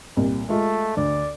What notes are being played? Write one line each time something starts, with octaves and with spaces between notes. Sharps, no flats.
C2 A#2
G#3 A3 F4
D2 D5